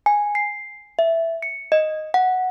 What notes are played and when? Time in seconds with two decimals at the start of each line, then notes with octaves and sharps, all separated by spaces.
0.06 G#5
0.35 C7
0.99 E5
1.42 C#7
1.72 D#5
2.14 F#5